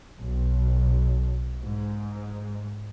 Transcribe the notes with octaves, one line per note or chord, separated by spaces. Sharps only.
B1
G#2